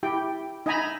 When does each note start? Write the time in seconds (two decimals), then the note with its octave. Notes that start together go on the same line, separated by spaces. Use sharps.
0.03 E4 G4 G5
0.66 D#4 D#5 E5 G#5 A#5 B5